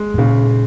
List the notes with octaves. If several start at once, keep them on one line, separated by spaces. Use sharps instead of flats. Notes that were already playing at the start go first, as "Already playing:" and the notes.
Already playing: G#3
G#2
A#2 C#3